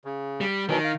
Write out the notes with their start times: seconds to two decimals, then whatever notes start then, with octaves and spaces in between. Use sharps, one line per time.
0.05 C#3
0.41 G3
0.69 B2 D#3 E3 F#3
0.84 F5